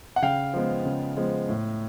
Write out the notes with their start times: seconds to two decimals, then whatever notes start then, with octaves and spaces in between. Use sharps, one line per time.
0.16 F#5
0.22 C#3 F5 G5
0.53 F3 G#3 B3
0.85 C#3
1.17 F3 G#3 B3
1.49 A2